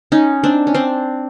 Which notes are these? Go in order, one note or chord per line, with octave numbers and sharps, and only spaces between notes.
C#4 D#4
C4 D4
C#4
C4 D4